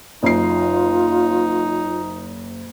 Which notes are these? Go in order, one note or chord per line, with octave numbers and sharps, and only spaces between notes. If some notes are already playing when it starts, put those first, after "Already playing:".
F#1 D#4 F4 C7